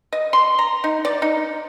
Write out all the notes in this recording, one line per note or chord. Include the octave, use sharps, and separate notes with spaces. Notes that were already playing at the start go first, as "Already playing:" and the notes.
D#5
C6
A#5
D#4
D5
D#4